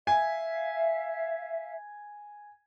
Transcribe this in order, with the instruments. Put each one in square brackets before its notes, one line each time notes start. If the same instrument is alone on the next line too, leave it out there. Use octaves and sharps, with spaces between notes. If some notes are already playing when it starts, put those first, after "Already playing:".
[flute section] E5 F5 [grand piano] G#5